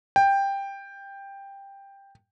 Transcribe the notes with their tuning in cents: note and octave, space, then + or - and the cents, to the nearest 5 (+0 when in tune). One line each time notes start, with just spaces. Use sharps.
G5 +10